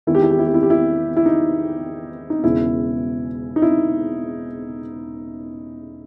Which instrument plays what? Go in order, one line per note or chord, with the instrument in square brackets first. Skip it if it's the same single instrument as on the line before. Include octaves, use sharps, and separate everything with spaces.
[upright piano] E2 D#3 G#3 E4
G4
E4
G4
E4
G4
E4
G4
E4
E4
D#4
D#4
E1 E2 C#3 E4
D#4
E4